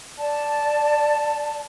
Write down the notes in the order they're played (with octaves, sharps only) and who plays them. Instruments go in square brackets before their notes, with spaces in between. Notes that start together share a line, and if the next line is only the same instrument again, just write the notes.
[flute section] D5 A5